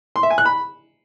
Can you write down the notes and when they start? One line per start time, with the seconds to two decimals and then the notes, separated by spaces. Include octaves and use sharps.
0.16 C6
0.23 E5
0.31 G#5
0.38 F#6
0.45 B5